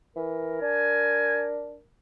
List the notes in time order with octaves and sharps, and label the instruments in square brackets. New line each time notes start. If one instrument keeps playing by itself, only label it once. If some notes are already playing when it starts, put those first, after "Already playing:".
[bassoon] E3 [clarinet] A#4
[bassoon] D4 [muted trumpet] G#5